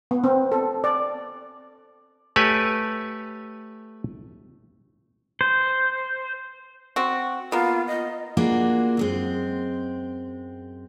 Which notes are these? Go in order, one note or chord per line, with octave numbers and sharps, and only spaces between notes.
B3
C4
A4
D5
A3 G4 B4 C#5 G#5
C5
C4 F#4
A#3 B3 F4
D#5
A#3 D4 F4 F#4 G#4
F#2 G#3 C4